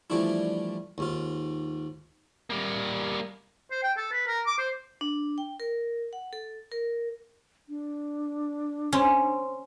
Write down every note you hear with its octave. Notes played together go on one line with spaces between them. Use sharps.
E3 F3 G3 A3 D4 E4
D#2 G#2 F4
G3 A#3
C5
G5
A4
B4
A#4
D6
C5
D4
G5
A#4
F#5
A4
A#4
D4
C#4 C5 C6